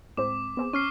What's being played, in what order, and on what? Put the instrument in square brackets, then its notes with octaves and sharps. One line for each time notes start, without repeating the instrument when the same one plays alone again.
[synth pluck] A2 G#3 C4 [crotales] D6
[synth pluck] B3 C4 G#4
[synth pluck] C#4 [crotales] C#6 F6 C7